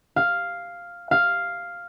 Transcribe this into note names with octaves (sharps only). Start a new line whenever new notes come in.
F5
F5